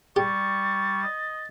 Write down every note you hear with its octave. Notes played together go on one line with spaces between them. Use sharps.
G3 G4 C#6 A6
D#5